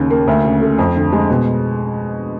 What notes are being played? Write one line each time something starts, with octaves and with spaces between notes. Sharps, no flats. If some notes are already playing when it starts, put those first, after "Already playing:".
Already playing: D#2 C#3
A#3
D2
C#3
A3
F2
D3
G#3
B2